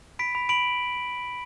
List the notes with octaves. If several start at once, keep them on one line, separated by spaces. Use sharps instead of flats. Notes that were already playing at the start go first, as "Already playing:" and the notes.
B5 B6 D7
B5
B5 D7 F#7